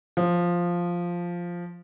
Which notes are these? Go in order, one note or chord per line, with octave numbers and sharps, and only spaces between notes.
F3